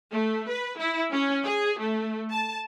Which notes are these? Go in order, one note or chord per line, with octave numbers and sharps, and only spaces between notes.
A3
B4
E4
C#4
G#4
A3
A5